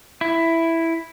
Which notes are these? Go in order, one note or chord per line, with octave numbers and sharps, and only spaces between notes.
E4